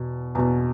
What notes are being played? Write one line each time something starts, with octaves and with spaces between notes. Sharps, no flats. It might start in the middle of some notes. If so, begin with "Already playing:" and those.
Already playing: E2 B2
E2 B2